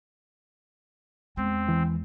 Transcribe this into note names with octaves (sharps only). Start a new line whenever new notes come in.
E2 G#3 C4
E3